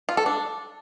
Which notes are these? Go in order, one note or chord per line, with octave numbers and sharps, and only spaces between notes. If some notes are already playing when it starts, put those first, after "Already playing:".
F4
A4
D4